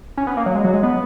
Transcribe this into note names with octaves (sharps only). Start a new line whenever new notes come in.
C#4
B3
A#3
F#3
G#3
F#3
G#3
B3